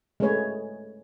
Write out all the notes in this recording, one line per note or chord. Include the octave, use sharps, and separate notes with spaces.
G#3 A3 G#4 B4 C#5